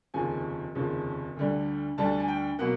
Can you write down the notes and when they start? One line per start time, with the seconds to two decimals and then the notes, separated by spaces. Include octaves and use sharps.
0.14 F1 D#2 C#3 F3 G#5
0.75 F1 D#2 C#3 F3
1.36 D2 D3 G3
1.98 D2 D3 G3 A5
2.20 G#5
2.28 G5
2.59 B2 F#3 A#3 F#5